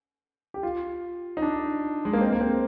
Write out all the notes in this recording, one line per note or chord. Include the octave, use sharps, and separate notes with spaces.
G4
F4
D#4
D4
G#3
A#3
C4
A#3
C4